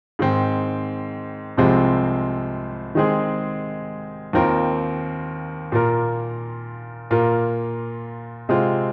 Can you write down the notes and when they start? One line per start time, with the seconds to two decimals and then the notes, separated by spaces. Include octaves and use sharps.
0.19 G#2 D#3 C4
1.57 C2 C3 F3 G#3 C4
2.95 D#3 G#3 C4 G#4
4.33 D#2 D#3 C4 F4 A#4
5.72 A#2 A#3 F4 A#4
7.11 A#2 A#3 F4 A#4
8.49 C3 G#3 C4 F4